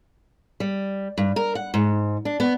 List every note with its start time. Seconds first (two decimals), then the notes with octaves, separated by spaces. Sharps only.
0.60 G3
1.18 G2
1.36 A#4
1.55 F#5
1.74 G#2
2.25 D4
2.40 B3